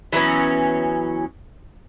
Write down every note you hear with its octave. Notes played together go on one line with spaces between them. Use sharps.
E3 F#3 B3 C#4